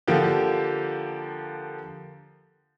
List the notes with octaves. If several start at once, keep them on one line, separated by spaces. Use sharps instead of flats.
D3 F3 A#3 G4